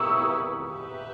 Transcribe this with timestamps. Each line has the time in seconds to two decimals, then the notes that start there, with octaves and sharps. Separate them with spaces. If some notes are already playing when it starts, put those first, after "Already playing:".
Already playing: A#3 E4 G4 B4 C#6 D#6 E6
0.68 G4 B4 E5